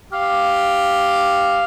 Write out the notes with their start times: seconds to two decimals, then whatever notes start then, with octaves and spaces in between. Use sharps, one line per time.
0.12 G4 F5